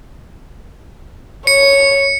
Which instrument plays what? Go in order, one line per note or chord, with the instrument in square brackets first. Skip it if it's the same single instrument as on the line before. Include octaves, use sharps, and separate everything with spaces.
[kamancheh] C#5 [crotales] C#7